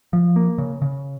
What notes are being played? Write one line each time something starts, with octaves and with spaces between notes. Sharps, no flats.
F3
A#3
C#3
C#3